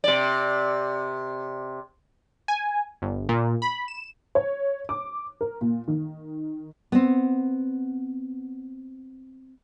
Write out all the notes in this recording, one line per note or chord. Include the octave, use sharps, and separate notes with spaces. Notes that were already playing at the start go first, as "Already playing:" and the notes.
C3 D5
G#5
G1
A#2
B5
E7
C#5
D6
A#4
A#2
D#3
B3 C4